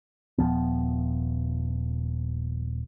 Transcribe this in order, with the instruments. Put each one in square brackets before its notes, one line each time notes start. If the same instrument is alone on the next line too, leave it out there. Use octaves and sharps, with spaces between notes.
[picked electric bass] D#1 F#2 F3 B3